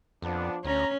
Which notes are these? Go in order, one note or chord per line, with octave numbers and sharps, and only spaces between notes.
F2 F3 B3 D4
D2 C#4 A#5